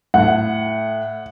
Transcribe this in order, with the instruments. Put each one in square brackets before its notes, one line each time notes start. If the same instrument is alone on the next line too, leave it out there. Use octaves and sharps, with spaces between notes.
[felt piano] A2 [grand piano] F#5